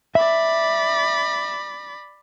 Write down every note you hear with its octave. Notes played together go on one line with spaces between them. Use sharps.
D5 E5 B5